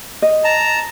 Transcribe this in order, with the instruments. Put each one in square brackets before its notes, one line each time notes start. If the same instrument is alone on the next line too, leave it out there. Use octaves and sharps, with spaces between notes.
[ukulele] D#5
[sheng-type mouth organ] A5 A#5